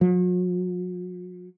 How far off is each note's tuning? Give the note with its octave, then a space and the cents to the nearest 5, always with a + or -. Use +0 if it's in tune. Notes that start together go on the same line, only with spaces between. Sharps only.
F#3 -45